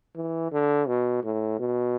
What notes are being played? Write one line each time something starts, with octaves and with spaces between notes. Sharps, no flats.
E3
D3
B2
A2
B2